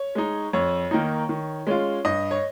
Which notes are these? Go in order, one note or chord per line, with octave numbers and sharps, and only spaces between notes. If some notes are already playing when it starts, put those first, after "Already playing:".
Already playing: C#5
G#3 D#4
F2 C#5
D#3 A#3 D#4
D#3
G#3 C#4 F4
G2 D#5
C#5